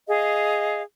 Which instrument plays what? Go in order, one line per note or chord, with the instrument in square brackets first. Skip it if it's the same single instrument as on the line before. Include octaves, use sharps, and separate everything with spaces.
[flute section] G#4 D#5 F5